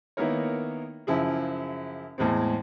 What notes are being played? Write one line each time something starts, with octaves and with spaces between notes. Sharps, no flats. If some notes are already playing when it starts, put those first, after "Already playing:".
D#3 A#3 B3 E4 A#4 C#5
F#2 C#3 F3 E4 G#4
E2 A2 G#3 C4